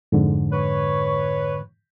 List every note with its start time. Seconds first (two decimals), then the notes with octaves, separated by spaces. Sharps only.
0.12 F2 G#2 D3
0.52 B4 C#5